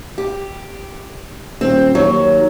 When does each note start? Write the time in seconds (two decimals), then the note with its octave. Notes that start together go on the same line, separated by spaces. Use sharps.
0.18 G4
1.61 D#1 C4
1.95 D#2 F#3